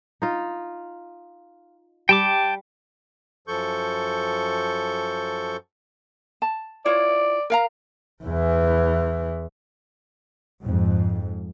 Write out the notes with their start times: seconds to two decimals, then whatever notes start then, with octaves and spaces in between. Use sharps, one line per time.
0.22 D#4 F4
2.09 G3 G5 A5 D6
3.48 F#2 F3 A4 C#6 G6
6.42 A5
6.86 E4 F4 C#5 D5
7.50 A#4 F5 A#5
8.24 E2 E3
10.64 F2 G#2